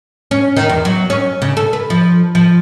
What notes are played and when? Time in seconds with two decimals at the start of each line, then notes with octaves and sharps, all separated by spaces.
0.31 C#4
0.57 D#3
0.69 E2
0.85 F#3
1.10 C#4
1.42 C#3
1.57 A4
1.73 B4
1.90 F3
2.35 F3